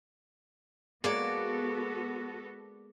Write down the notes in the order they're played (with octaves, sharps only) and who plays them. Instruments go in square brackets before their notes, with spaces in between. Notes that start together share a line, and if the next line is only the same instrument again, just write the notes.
[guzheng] G#3 A#3 C#5 [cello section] B3 F#4 A4 [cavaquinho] D5